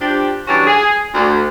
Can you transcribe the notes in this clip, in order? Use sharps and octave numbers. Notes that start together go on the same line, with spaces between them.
F3 D4 G4
E3 F#3 G3 C#4 D4 F#4
G#4
D2